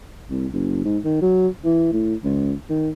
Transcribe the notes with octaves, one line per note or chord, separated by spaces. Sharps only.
C2
F#1
G#2
D#3
F#3
E3
A2
C#2
D#3